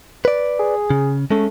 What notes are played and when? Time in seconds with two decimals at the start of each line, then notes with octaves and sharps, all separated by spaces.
0.25 B4 D5
0.59 G#4
0.90 C#3
1.30 G#3 A3 C#4